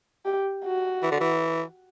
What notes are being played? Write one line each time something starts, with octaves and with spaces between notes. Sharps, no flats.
G4
F#4
E3
D3
E3